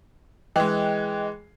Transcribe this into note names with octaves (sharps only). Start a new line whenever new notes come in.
E3 G#3 D#5 G5 F#6